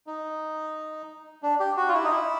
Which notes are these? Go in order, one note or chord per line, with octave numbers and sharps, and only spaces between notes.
D#4
D4
G4
F#4
F4
E4
D#4
E4